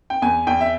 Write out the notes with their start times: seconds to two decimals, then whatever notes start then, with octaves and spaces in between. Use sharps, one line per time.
0.10 G5
0.22 E2 G#5
0.47 E2 G5
0.61 E5